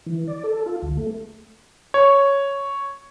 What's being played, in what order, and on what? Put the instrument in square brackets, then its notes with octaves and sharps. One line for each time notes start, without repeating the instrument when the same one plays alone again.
[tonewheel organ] E3
D5
A4
F4
D2
A3
[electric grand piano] C#5